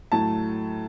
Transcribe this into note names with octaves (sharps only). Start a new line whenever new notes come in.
A2 F#3 A3 A5